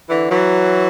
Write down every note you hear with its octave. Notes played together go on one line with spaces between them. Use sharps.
D3 E3
E3 F#3